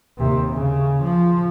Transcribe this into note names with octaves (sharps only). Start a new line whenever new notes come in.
D#2 C3
C#3
F3